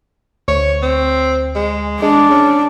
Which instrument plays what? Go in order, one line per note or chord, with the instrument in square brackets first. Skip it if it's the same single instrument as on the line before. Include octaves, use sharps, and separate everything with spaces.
[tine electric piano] D2 [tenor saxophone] C#5
[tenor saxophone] C4
G#3
[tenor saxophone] G#3 [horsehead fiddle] D4
[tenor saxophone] C#4